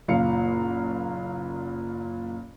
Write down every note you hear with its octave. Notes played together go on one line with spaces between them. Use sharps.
F#1 A#2 F5 C#7